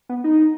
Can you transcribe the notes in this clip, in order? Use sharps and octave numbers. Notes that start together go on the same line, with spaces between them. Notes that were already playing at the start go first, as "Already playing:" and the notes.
B3
D#4